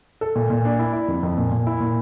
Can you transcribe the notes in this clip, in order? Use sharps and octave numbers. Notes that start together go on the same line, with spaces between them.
A4
A#2
A#2
D4
E4
E4
F2
F2
A#2
A#2
E4
A#2